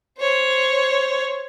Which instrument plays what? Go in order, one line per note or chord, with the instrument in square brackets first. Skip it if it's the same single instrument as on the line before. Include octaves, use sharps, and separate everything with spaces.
[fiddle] C5 C#5